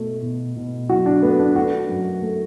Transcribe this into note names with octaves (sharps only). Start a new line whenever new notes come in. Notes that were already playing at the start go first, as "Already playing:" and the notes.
Already playing: B2 A3
B2
B2
F#3 F#4
D4
A3 B3
D4
A3 F#4
F#2
A3